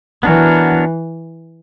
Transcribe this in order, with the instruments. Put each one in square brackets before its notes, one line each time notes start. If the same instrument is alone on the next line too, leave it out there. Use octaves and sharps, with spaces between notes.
[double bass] E3 [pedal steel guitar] B3 D4 F#4 A#4 C#5